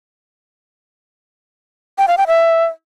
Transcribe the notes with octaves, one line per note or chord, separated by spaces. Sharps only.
G5
F5
G5
E5